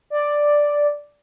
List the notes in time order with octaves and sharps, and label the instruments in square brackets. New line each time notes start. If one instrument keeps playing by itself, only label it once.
[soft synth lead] D5